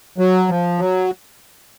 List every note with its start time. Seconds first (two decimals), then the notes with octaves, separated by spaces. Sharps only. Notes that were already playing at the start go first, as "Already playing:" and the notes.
0.18 F#3
0.49 F3
0.79 F#3